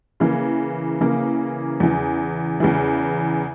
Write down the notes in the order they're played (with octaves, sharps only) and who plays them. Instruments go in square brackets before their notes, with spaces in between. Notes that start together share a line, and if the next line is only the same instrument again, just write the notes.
[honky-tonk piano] C#3 E3 A#3
C#3 E3 A#3
E2 C#3 E3
E2 C#3 E3